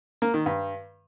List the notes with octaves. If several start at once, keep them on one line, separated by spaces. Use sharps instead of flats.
A#3
D#3
G2